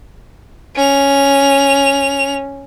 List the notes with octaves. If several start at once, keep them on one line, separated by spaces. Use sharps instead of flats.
C#4 F7